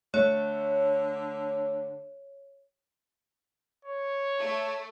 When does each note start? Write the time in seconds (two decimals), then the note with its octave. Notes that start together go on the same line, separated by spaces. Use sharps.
0.14 D3 A3 C#5
3.85 C#5
4.40 A3